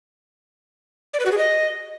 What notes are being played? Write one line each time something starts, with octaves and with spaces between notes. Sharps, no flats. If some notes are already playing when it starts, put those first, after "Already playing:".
D5
B4
F#4
G#4
D#5